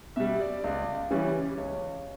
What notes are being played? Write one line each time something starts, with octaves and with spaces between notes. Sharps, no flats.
B2 G3 E5
D5
C#2
C#3 E3 G3 C#4
C#2 C#5